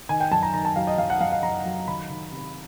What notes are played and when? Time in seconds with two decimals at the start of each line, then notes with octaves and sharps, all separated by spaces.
0.09 D#3 G#5
0.20 G5
0.31 F#2 A5
0.43 A#5
0.54 D#3 A#5
0.65 A5
0.76 F#3 F5
0.87 D#5
0.98 F#2 F5
1.10 F#5
1.21 F#2 F5
1.32 F5
1.43 F#2 A#5
1.66 F#3
1.87 D#3 B5
2.10 D#3
2.32 C3